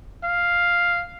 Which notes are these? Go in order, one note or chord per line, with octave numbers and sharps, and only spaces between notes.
F5